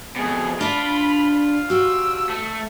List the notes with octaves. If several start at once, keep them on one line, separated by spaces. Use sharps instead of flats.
F2 B2 G#4
D4 F4 D5 B5
F#4 G4 E6
A3